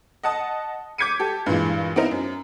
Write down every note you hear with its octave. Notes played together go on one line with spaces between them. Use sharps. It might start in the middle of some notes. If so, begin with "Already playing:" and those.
D#5 F#5 A5 D#6
D6 G6 G#6 B6 C#7 D#7
G4 A4
G2 A#2 E3 G#3
B3 C4 D#4 E4 A#4 C5
F#2